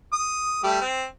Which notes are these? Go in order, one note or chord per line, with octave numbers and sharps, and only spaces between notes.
D#6
G3 A3 G4
C4